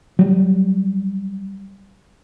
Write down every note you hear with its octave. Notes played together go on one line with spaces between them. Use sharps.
F#3 G3